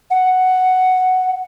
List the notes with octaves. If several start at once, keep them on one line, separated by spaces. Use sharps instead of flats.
F#5